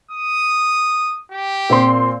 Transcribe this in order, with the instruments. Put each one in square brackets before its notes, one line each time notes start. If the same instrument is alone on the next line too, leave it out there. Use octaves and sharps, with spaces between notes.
[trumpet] D#6
G4
[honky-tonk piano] A#2 C4 C6